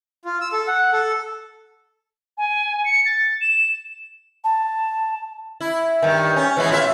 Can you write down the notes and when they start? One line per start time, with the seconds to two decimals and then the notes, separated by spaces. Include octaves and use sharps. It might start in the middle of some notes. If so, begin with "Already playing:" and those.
0.25 F4
0.41 E6
0.53 A4
0.67 F#5
0.93 A4
2.38 G#5
2.85 C#7
3.06 A6
3.41 E7
4.44 A5
5.61 E4
6.02 G2 D#3
6.36 C#4
6.57 E3 G#3 B3
6.70 A2 F4 E5